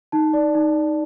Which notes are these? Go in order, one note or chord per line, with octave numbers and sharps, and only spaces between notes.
D#4 A5
D5
D#4